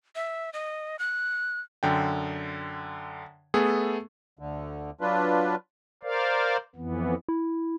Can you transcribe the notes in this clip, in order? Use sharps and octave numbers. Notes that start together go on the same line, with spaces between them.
E5
D#5
F#6
F#2 D3 G5
A3 B3 G#4 A4
D2 D3
F#3 D4 F4 B4
A#4 C5 D5 F5
F2 E3 B3
E4